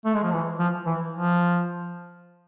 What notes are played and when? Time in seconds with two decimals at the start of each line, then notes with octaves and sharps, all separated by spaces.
0.05 A3
0.14 G#3
0.23 F3
0.33 E3
0.59 F3
0.86 E3
1.13 F3